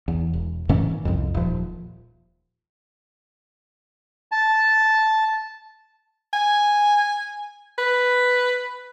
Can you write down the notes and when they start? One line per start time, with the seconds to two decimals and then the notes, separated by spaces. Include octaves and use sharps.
0.08 E2
0.33 E1
0.69 G#2 D#3 E3 C#4
1.05 C2 F2
1.34 D#1 F3
4.32 A5
6.33 G#5
7.78 B4